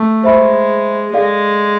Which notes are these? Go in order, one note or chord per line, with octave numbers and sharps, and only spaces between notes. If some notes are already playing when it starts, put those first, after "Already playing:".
Already playing: A3
G#3 C5 E5 B5
G#3 A4 D5 F5